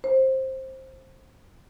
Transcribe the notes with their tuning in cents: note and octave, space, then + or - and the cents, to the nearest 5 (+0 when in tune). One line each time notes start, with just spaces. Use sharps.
C5 +15